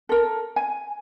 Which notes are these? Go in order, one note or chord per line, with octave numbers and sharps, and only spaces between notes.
A4 A#4
G#5